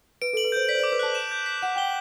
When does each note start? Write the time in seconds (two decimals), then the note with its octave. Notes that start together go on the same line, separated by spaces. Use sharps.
0.22 B4 D7
0.33 A4
0.37 F#7
0.44 B4
0.52 C5 G6
0.69 D5 B6
0.75 C5
0.80 D5
0.83 D6
0.92 B4
0.99 A5 F#6
1.15 E7
1.32 G6
1.46 B6
1.62 F#5 E7
1.76 G5 G7